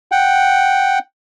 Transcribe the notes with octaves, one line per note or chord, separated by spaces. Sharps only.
F#5 G5